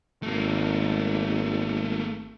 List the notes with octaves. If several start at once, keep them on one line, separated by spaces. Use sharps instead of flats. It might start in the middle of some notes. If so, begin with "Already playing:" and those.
G#1 A3 A#3